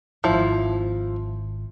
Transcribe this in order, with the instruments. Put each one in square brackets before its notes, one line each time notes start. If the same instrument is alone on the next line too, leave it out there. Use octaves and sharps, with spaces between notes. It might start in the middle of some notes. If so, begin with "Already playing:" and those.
[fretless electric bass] D#1 G#1 [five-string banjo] F3 E4